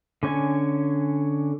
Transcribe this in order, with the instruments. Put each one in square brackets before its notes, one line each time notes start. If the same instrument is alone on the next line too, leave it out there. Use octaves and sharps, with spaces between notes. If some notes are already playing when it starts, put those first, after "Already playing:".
[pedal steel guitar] D3 C#4 C#5 G#5